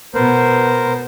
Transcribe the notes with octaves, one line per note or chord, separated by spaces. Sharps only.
B2 B3 A#4 C5